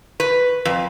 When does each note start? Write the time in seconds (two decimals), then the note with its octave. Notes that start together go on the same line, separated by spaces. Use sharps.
0.20 B4
0.65 F2